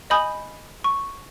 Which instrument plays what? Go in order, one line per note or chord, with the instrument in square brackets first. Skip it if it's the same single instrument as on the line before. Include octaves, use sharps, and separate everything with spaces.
[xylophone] D#5 G#5 B5 D#6 G6
C#6